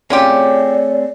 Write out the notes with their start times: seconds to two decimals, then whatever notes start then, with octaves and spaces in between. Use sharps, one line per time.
0.10 A3 C4 C#4 F4 G4 G#4 C#5 D5